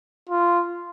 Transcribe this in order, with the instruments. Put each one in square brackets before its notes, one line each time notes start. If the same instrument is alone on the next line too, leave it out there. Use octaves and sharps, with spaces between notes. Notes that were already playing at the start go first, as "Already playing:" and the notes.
[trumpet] F4